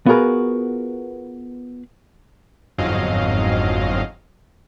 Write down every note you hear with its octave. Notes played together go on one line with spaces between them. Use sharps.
B3 F4 F#4 G#4 A#4 B4
G1 F2 G#2 F#3 D#5 F5